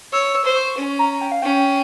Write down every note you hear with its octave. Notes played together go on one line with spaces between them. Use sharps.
C#5 E6
E6
C5
C#6
C#4
A#5
G5
F5
C#4 G5